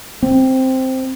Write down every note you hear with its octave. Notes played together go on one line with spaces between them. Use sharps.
C4